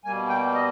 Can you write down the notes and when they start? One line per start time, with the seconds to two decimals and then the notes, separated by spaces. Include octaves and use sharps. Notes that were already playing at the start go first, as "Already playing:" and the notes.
0.04 B2 G3 A#3 G#5
0.29 G5
0.54 D#5